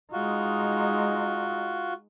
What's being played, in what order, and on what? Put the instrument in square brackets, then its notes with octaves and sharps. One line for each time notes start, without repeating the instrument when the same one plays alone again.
[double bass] G#3 D#4 [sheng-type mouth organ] F4 F#4